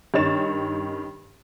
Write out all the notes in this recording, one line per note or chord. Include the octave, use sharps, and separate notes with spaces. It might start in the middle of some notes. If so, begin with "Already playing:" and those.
G2 D#3 C#4 C#5 A6 E7